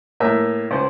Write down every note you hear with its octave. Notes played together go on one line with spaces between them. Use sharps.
A2 A#3 E5
C#2 C5